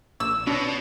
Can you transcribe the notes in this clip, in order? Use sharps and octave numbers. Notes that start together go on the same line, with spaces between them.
A#1 E6
B2 C#4 D4 C#5